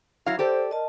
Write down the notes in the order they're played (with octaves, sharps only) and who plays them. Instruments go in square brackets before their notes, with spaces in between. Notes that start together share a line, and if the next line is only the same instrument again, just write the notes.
[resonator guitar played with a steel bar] F#3 F5 [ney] E4
[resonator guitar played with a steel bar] G4 A4 [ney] C5 [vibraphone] D5
[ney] A#4 [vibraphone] D#5 A5